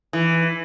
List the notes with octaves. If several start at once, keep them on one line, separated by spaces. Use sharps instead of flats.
E3